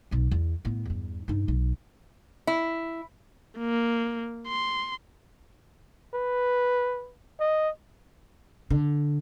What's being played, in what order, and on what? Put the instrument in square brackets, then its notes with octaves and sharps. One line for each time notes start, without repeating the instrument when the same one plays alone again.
[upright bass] B1 B2
E2
A2 B3
E2 G2
G2 D#4
B1
[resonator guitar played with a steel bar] E4
[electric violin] A#3
C6
[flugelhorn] B4
D#5
[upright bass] D3